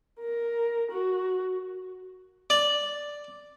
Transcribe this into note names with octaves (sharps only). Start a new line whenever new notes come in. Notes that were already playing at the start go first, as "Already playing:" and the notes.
A#4
F#4
D5